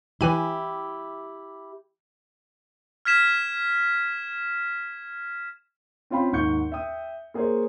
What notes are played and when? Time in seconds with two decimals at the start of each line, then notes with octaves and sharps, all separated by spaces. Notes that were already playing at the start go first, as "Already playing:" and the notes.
0.21 E3 E4 G4 G#5 B5
3.05 F6 G#6 B6 E7
6.10 C4 C#4 F4 F5 G5 B5
6.32 D#2 G#2 F#5 C#6 G6 C#7
6.72 E5 G5 D#6
7.34 A#3 G#4 A#4 C5 C#5